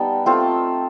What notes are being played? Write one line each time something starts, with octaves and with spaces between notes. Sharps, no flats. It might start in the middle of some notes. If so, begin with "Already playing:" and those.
Already playing: G3 B3 D#4 G5 A5
A3 C4 F4 G5 A5